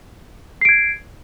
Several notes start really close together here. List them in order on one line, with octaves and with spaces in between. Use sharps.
C7 D7 G#6